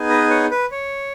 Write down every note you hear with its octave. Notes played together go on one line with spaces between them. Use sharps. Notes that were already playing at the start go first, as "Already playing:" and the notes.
Already playing: B3 D#4 G#4
B4 D#5
C#5 F#5
B4
C#5